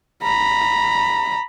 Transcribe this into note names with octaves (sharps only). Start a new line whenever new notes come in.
A#5 B5